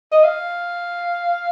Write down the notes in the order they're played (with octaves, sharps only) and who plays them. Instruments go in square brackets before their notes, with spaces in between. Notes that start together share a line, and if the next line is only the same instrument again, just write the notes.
[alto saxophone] D#5
F5